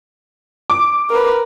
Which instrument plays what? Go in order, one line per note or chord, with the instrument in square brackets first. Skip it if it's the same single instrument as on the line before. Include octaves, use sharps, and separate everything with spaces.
[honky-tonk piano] D6
[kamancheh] A#4 B4